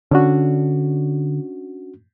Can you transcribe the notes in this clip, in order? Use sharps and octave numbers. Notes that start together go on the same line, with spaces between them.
D3 C#4 D4 F#4